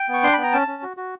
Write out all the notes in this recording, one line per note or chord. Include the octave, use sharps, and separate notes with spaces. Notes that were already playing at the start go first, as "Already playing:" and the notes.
Already playing: G5
B3 C#6
D4 C6
B3 B5
A#5
C#4 A5
C#4
F#4
F#4